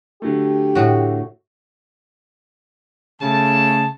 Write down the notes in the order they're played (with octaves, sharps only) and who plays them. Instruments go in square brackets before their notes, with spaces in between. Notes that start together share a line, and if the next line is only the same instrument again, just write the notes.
[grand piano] D3 F#3 A3 [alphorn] G4
[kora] A2 F#4
[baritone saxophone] C#3 [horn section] A3 A5